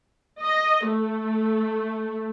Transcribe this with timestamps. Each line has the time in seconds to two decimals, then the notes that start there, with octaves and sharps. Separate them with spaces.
0.42 D#5
0.87 A3